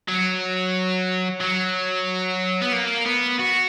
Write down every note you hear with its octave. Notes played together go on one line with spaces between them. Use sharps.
F#3
F#3
B3
A#3
B3
F#4